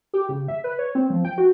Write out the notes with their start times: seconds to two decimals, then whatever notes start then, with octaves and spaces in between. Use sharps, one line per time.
0.14 G4
0.29 C#3
0.48 E5
0.64 B4
0.79 C#5
0.95 C4
1.10 F3
1.25 G5
1.38 F#4